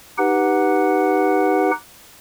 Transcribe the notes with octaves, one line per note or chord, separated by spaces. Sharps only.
D#4 G4 B4 F#5